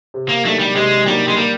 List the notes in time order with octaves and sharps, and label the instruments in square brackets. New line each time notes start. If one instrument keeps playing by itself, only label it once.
[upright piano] C3
[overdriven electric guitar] A#3
[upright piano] D#3 F#3 A#3 D4 [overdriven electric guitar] A3
[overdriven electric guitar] G3
[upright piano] C3 [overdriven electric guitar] G#3
[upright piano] D#3 F#3 A#3 D4 [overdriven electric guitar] G3
[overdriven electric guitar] G#3
[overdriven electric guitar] G3 [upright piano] A#3